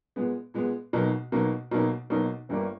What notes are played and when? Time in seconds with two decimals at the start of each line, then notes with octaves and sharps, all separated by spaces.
0.16 A#2 G#3 B3
0.54 A#2 G#3 B3
0.93 B1 B2 A#3 D#4
1.32 B1 B2 A#3 D#4
1.71 B1 B2 A#3 D#4
2.10 B1 B2 A#3 D#4
2.49 G1 G2 G3 A#3